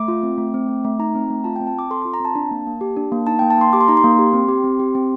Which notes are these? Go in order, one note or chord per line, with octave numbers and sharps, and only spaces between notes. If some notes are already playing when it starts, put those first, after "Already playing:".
Already playing: A3 D6
F4
C4
A3
C4
A3
A3
D#4 A#5
C4
A3
F4 A5
C4 G5
A5
C4 D6
A4 C6
F4 C6
A#5
C4 A5
D4
A#3
A#3
G4
D4
A#3
D#4 A5
A#3 G5
A5
A#3 C6
G4 D6
C6
D#4 A#5
C6
A#3
G4
C4
G4
C4
G4
C4